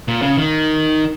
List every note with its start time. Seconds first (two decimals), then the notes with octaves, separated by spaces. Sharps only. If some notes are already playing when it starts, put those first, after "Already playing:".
0.08 A#2
0.22 C#3
0.37 D#3